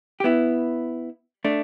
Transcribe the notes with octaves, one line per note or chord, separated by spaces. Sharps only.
G4
B3 E4
A3 D4